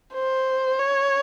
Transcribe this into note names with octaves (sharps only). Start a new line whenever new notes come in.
C5
C#5